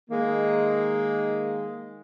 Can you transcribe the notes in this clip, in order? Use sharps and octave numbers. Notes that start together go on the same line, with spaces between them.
D#3 G#3 A#3